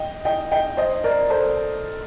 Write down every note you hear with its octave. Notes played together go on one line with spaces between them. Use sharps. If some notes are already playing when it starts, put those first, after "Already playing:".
Already playing: D#5 G5
D#5 G5
D#5 G5
C5 D#5
A#4 D5
A4 C5